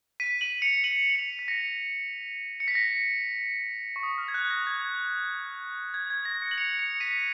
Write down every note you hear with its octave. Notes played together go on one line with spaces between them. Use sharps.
B6 D#7
D#7 F#7
C#7 F7
D#7 F#7
F#7
C#7 F7
B6
A#6 C#7
C#7
B6
A#6
C#6
D#6
F6
G#6
F#6
A#6
G#6
G#6
G#6
A#6
A#6 C#7
F#7
C#7 F7
C#7 F7
B6 D#7